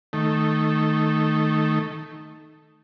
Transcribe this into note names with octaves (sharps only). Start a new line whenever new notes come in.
D#3 A3